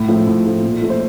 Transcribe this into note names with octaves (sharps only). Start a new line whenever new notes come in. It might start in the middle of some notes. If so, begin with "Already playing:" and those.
Already playing: A2
F3 A3
A2
F3 A3
A#2
F3 A3
C5